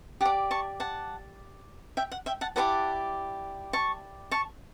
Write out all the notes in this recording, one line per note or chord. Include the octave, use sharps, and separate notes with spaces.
G4 D5 F#5 A5
A5 C#6
F#5 A5
E5 G5
F#5
E5 G5
F#5 A5
E4 G4 B4 D5 F#5 A5
A5 C#6
A5 C#6